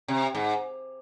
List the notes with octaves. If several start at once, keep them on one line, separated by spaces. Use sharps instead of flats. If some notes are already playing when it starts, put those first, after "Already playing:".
C3
G#2